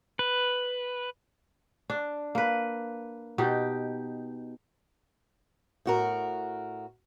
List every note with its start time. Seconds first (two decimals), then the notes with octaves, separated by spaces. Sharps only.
0.19 B4
1.90 D4
2.35 A#3 B4
3.38 B2 D#4 G4
5.86 A2 F#4 A#4